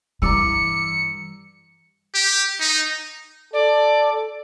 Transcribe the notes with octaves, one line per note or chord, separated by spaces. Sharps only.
G2 E3 D5 A#5 D6 E6 C#7
G4
D#4
A4 D5